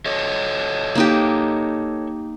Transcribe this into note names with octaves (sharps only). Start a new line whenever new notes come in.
A4 C#5 D#5
A#3 D#4 G4